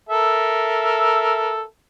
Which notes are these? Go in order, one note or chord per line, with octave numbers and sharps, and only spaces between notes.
A4 A#4 E5